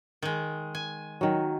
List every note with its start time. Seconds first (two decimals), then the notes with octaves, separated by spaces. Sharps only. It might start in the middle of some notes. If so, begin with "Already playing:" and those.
0.22 D#3 G#3
0.75 G#5
1.21 D#3 F#3